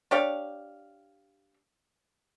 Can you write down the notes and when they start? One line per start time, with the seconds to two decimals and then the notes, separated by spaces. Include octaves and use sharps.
0.11 D4 G4 C#5 F5